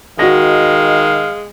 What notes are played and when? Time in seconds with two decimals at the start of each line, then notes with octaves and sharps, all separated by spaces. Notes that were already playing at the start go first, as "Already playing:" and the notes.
0.19 D#3 G#3 F#4 F5 A#6